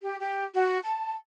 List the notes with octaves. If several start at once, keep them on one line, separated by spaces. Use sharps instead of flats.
G4
G4
F#4
A5